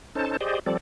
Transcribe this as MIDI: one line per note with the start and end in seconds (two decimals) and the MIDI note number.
0.15 0.37 61
0.15 0.37 63
0.15 0.37 69
0.15 0.37 72
0.15 0.37 81
0.41 0.59 67
0.41 0.59 68
0.41 0.59 72
0.41 0.59 74
0.41 0.59 75
0.66 0.77 53
0.66 0.77 55
0.66 0.77 60
0.66 0.77 69
0.66 0.77 74